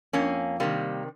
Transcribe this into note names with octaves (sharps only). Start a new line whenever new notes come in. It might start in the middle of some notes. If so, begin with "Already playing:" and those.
F2 A#3 C#4
C3 D#3 G3 A#3